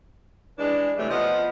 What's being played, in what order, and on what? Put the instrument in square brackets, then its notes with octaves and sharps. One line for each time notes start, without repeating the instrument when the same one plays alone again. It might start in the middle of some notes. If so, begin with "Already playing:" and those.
[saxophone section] E3 G#3 D4
C3 E3 G3 A3 C#5
F3 B3 F4 D#5